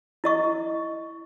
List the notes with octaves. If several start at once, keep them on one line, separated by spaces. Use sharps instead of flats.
E4 D#5 C#6